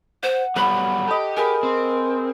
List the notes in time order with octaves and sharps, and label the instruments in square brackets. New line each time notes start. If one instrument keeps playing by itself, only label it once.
[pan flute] C5 [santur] F#5
[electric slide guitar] F#3 G3 B3 [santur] B4 F#5 [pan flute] B5
[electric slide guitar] G4 [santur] A4 D#5
[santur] G#4 B4 [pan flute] A#4
[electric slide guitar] C4